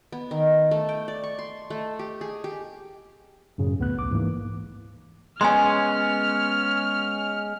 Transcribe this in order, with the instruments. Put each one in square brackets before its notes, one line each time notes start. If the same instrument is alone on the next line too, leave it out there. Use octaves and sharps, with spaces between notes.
[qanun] B3
D#3
A3
G5
D5
C#6
C6
A3
G4
G#4
G4
[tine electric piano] F#2 A2 C#3
D2 B3 F#6
A#1 D6
G#2 E3 A#3
[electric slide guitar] G#3 B3 C#4 [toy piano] G#5 C6 [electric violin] F6